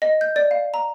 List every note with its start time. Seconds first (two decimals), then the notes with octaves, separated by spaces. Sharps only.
0.02 D#5
0.21 G6
0.36 D5
0.51 F5
0.74 A#5